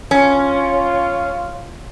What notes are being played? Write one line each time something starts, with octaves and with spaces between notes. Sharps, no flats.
C#4 F4